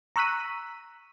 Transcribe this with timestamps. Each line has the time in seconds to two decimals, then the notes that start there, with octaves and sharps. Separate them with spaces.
0.16 A#5 C#6 E6 F#6 B6 D#7